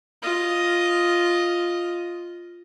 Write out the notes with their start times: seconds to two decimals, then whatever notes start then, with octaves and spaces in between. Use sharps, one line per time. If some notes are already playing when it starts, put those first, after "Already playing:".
0.22 F4 D#5